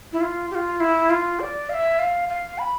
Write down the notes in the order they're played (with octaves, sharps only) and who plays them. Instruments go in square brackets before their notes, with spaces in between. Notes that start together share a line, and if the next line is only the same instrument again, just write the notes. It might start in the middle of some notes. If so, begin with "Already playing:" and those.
[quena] E4
F4
G4
F4
E4
F4
D5
F5
E5
F5
F5
B5